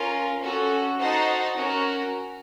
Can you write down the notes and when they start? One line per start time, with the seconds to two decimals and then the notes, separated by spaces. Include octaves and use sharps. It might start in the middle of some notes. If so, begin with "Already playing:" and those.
Already playing: C#4 F4 A#4
0.41 C#4 F#4 A4
0.98 D#4 F#4 C5 F#5 A5
1.55 C#4 F#4 A#4